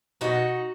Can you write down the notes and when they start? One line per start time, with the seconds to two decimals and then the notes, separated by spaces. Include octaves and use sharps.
0.21 B2 F#3 B3 D#4 F#4